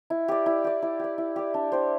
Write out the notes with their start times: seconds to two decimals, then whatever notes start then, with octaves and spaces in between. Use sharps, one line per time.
0.10 E4
0.28 G4 D5
0.46 E4
0.64 G4 D5
0.82 E4
0.99 G4 D5
1.18 E4
1.36 G4 D5
1.54 D4
1.72 G4 C5